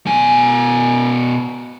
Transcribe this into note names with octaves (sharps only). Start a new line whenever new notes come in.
B2 G#5